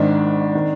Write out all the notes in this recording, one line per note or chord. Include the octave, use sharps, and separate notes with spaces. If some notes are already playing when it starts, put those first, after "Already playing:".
Already playing: G#1 G#2 D#3 D4 D5
D#3